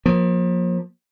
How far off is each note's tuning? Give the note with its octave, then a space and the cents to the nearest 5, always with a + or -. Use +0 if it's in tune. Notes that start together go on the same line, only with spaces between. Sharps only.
F3 +35 A#3 +30